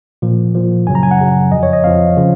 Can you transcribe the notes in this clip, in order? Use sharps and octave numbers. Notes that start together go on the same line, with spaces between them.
A#2 F3
A#2 F3
F#2 C#3 F#3 G#5
A#5
G#5
F#5
F#2 C#3 F#3
F2 F3 D#5
C#5
D#5
F2 F3 F5
C#3 F3